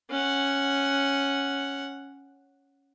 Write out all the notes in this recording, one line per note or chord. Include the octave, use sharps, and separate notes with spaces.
C#4 F#5